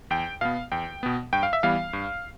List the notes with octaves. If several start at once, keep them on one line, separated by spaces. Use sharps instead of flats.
E2 G5
B2 B3 F5
E2 G5
B2 B3
G2 G5
F5
E5
E3 G3 B3 F5
G2